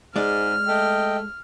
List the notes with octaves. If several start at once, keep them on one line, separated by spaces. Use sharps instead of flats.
G#2 G#3 D5 F6
A3 D#5 G5